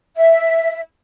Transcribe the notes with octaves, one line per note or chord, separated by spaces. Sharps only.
E5